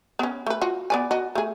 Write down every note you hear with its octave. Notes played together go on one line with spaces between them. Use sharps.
B3 C#4
A3 B4
F4 F#4
B3 D5 G#5
F#4 D#5
A3 G#4